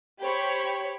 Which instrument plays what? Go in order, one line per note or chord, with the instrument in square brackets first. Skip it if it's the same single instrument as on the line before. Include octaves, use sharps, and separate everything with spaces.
[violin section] G4 C5 C#5 B5